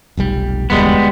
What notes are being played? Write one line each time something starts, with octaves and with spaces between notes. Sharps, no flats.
F1 B1 G3
E1 D2 G2 G3 G#3 B3